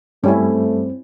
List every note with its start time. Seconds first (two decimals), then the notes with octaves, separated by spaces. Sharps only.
0.24 G2 G3 A3 C4 C#4 E4